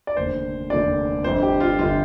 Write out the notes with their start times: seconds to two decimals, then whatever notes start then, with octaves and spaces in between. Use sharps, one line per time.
0.07 D5
0.17 F1 D#2 D3 C5
0.70 F1 D#2 D3 D5
1.24 G1 F2 D3 C5
1.43 G4
1.60 F4
1.79 G1 D3 F4